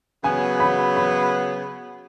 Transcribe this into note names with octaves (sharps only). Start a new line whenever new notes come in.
C#3 F#3 B3 G#5
B5
B5